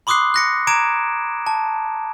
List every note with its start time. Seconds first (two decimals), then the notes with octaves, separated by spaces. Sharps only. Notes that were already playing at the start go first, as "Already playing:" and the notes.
0.07 B5 C6 D6 D#6 F#6 C7
0.34 F#6 A#6 C#7
0.67 A#5 D6 G#6 D7 E7
1.47 A5